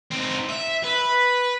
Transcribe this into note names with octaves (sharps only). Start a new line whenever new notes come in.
C4 D#4
E5
B4